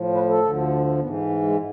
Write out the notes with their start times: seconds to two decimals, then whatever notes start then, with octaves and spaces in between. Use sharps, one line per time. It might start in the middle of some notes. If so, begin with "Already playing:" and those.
Already playing: A2 F3
0.14 B4
0.30 A4
0.44 D2 D3 F3
1.00 G#2 E3 B3
1.29 A3
1.43 G#3